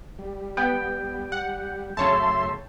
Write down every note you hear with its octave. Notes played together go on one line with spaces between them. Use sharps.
G3
B3 G5
F#5
F#2 C#3 A3 C#5 E5 A5 C6